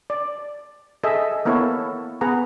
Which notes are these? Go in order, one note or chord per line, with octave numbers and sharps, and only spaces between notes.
D5
G#4 A4 D#5 E5
A#3 B3 E4 A4 A#4 C#5
B3 G#4 B4 F#5 A#5